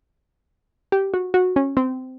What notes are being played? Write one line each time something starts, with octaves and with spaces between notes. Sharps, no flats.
G4
F#4
F#4
C#4
C4